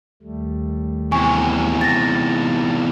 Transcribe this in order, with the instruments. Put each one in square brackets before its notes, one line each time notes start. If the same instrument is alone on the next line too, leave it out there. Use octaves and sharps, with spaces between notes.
[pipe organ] D#2 G3 A3
[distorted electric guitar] E2 C3 [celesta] G#5 C#6
[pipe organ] D#4 A5 [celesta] A6 A#6